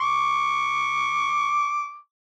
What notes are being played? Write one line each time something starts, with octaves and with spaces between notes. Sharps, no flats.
C#6 D6